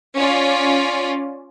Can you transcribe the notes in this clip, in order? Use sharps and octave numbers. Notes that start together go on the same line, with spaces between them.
C#4 F4 D5